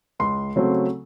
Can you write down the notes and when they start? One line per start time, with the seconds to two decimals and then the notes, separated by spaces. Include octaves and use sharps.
0.19 C#2 C6
0.56 C#3 F#3 A3 C4